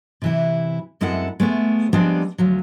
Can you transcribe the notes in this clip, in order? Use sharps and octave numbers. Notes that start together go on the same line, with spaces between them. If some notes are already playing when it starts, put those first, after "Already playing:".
C3 E3 E4
F#2 G#3 C4 E4 A4 F#5
G#3 A3 B3
F3 G3 G#3 B3 C4 D4
D2 F3 F#3